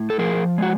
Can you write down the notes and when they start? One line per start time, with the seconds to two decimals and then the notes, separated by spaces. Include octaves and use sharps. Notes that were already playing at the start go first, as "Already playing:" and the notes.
Already playing: A2
0.10 A4
0.19 F3 G#4 A#4
0.58 G#3 F#4